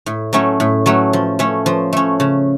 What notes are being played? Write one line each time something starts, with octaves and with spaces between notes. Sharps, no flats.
A2
F#3 A3 C#4
A2
F#3 A3 C#4
F3
A3 C#4
F3
A3 C#4
C#3